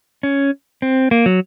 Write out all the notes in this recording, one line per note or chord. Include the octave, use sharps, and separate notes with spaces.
C#4
C4
A#3
F#3